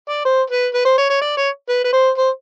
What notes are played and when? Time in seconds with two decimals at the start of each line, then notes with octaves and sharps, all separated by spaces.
0.09 D5
0.25 C5
0.50 B4
0.74 B4
0.85 C5
0.98 C#5
1.10 C#5
1.21 D5
1.37 C#5
1.69 B4
1.84 B4
1.93 C5
2.18 C5